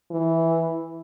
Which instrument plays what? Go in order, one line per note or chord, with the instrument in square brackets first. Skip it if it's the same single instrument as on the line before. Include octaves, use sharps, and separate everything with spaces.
[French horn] E3